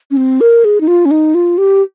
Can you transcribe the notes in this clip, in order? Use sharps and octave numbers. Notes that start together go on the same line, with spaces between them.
C#4
C4
A#4
G#4
D#4
F4
C#4
D#4
F4
G4